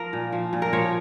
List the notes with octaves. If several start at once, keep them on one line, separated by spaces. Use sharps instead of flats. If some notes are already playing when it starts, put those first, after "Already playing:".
Already playing: F3 A#4
A#2
F3
A#2
A#4
F3 C#5